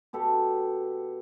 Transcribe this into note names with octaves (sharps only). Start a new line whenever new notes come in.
B2 G4 A4 B4